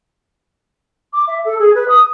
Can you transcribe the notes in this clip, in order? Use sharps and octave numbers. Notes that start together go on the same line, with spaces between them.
D6
E5
A4
G#4
B4
D#6